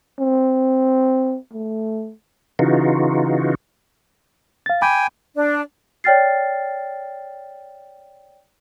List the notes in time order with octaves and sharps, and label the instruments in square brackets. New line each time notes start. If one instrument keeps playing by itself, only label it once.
[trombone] C4
A3
[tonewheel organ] C#3 E3 D#4 F4 F#4
[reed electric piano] F5 A6
[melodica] G5 G#5 [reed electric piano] B5 D6
[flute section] D4
[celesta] C#5 D5 G5 F6 A6 C7